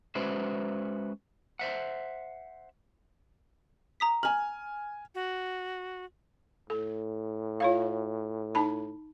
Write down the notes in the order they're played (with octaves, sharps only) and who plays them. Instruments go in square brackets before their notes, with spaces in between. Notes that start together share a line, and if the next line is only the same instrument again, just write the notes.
[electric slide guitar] G#3 C#4 F#4 B4 C5 E5
C5 E5 F#5
[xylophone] A#5 D#6 B6
[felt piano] G#5 F6 [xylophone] F#7
[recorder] F#4
[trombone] A2 [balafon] A4
[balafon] F4 C#5 F5
D#4 A5 B5